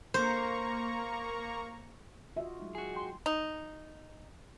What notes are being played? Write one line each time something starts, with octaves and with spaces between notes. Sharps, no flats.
A#3 C5 A#5 C#6
F4 F#4 D#5 E5
F#3 G#3 D#4
F#4 G#4
G5 C6
D#4